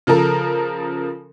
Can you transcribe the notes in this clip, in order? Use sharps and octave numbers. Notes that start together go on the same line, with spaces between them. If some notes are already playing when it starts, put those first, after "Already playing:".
C#3 F3 A4 A#4